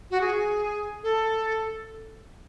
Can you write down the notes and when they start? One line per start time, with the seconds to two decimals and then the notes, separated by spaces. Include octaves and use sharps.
0.11 F#4
0.21 G#4
1.03 A4